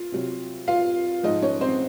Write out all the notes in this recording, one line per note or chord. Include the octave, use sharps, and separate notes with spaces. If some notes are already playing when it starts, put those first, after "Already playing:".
Already playing: F4
C3 F#3
F4 F5
G#2 F3 G#3 D#4 D#5
C#4 C#5
C4 C5